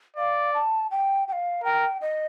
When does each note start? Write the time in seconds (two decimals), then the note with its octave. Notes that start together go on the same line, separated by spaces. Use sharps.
0.17 D5 F5
0.54 A5
0.91 G5
1.28 G5
1.32 F5
1.64 A#4 G5
2.01 D#5